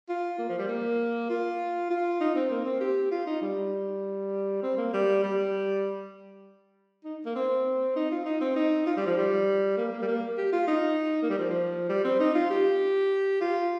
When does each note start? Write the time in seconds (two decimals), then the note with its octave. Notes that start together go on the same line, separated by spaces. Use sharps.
0.09 F4
0.39 A#3
0.49 F3
0.59 G3
0.68 A#3
1.30 F4
1.90 F4
2.20 D#4
2.35 C4
2.50 A#3
2.65 C4
2.80 G4
3.11 F4
3.27 D#4
3.42 G3
4.62 C4
4.77 A#3
4.93 G3
5.24 G3
7.04 D#4
7.26 A#3
7.36 C4
7.96 D#4
8.11 F4
8.25 D#4
8.41 C4
8.56 D#4
8.86 F4
8.97 G3
9.06 F3
9.17 G3
9.77 A#3
9.92 A#3
10.02 G3
10.08 A#3
10.38 G4
10.52 F4
10.68 D#4
11.23 A#3
11.29 G3
11.38 F3
11.49 F3
11.89 G3
12.04 C4
12.20 D#4
12.34 F4
12.50 G4
13.41 F4